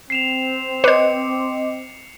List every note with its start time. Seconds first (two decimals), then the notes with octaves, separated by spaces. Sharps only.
0.10 C4 C7 E7 F7
0.84 B4 C5 D#5 C6 D6 C#7